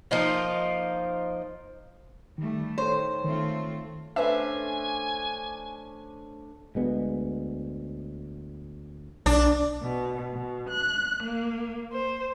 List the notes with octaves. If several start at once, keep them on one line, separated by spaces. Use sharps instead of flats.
F3 A#3 D#4 F4
D#3 G3 A3
D#3 A4 C5 C#5
D#3 A3 C4 F4
A3 C#4 D4 B4 C5 D#5 E5 G#5
D2 G#3 B3
B1 D4
B2
B2
F#6
A#3
C5